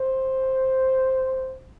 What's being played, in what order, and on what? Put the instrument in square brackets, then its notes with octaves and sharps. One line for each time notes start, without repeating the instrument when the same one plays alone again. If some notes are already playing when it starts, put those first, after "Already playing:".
Already playing: [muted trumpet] C5